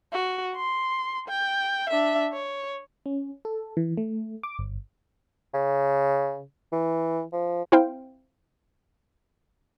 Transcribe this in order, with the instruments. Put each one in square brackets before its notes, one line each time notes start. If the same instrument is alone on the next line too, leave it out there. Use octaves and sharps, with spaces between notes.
[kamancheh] F#4
C6
G5
D4 E5
C#5
[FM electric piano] C#4
A4
E3
A3
D6
G1
[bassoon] C#3
E3
F3
[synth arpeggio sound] C4 E4 C5 F5 G5